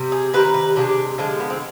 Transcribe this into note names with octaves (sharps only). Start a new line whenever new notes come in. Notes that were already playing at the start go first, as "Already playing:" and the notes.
Already playing: C3 G3
G#4
C3 D#3 G3 B4
B4
C3 F3 G#3 D4
D3 F3 G#3 D4
B3
C4